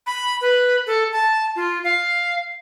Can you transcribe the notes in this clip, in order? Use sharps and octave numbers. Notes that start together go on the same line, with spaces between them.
B5
B4
A4
A5
F4
F5